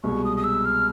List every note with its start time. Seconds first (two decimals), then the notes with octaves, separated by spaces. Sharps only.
0.03 C2 B2 G#3 C#6
0.25 D#6
0.37 D#6
0.44 E6
0.65 F6